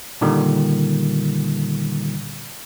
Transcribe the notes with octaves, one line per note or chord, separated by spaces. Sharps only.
A#2 D3 D#3 G3